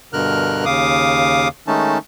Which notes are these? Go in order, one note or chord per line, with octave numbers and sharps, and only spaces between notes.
G2 B2 D3 A#4 F6 F#6
D#2 C#3 F5 D6 D#6
D#3 G#3 A3 C#4 D#4 A5